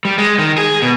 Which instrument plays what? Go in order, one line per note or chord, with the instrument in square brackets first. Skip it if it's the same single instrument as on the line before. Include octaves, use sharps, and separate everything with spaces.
[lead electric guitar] G3
G#3
D#3
G#4
B2